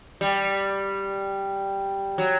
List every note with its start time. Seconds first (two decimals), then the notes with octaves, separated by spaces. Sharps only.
0.21 G3
2.18 F#3